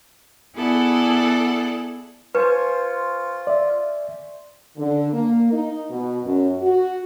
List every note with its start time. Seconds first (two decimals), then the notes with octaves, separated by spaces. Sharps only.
0.55 B3 E4 G#4 A4 D5 F#5
2.35 F4 B4 C5 G#5 C#6
3.47 D5 E5
4.77 D3
5.14 A#3
5.53 D#4
5.90 B2
6.25 F#2
6.62 F#4